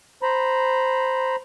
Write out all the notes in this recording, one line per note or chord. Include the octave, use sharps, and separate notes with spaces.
C5 A#5 B5